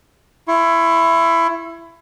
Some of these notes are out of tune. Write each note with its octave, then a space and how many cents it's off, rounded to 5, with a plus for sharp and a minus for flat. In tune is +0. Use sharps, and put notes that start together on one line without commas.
E4 +20 C#6 -40